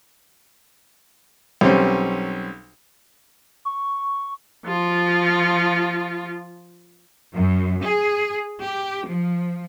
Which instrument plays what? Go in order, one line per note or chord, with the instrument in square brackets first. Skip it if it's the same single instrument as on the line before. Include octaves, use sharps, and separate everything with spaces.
[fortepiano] B1 G3 C4 C#4
[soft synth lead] C#6
[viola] F3 F4
[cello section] F#2
G#4
G4
F3